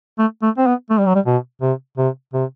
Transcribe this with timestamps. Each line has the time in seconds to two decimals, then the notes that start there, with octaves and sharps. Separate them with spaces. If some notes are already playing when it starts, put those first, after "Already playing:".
0.18 A3
0.42 A3
0.57 C4
0.67 B3
0.90 A3
0.98 G3
1.07 F#3
1.15 G3
1.26 B2
1.62 C3
1.98 C3
2.33 C3